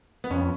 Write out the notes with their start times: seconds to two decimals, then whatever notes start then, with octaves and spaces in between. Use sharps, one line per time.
0.24 B3
0.31 F2 C#4